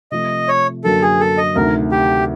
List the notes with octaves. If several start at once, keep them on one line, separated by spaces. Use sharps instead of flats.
C3 F3 A3 D#5
C#5
F#2 D3 F#3 A#3 A4
G#4
A4
D#5
D2 C3 D#3 A#4
G4